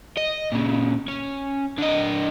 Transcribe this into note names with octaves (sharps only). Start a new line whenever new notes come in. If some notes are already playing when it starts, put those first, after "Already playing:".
D#5
A#2 C#3
C#4
D3 D#5